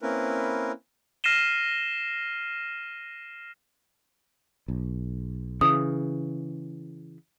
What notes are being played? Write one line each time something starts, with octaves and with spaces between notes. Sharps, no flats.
A#3 C4 C#4 E4 A#4 B4
F6 A#6 C7 D#7 E7 G7
B1
C#3 E3 D#6